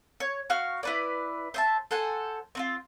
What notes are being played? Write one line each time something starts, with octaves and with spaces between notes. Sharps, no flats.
C#5
F#4 F5 C#6 F6
E4 B4 D5
C5 E5 A5
A4 C5 F#5 G#5
C4 D#4 F4